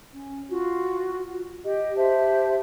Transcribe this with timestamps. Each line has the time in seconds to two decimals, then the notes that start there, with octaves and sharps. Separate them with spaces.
0.14 C#4
0.50 F4 F#4
1.63 G4 D#5
1.97 G4 C5 E5 A5